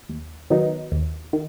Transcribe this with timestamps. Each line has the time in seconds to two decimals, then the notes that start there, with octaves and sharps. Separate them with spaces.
0.09 D#2
0.50 D#3 F#3 B3 D#4
0.92 D#2
1.33 D#3